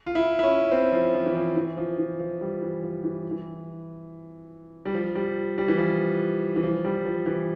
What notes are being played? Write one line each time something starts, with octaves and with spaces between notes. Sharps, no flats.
F4
E4
E4
C#4
C4
F3
F3
E3
F3
E3
F3
E3
F3
G3
E3
F3
E3
E3
G3
F3
G3
G3
E3
F3
E3
F3
G3
F3
E3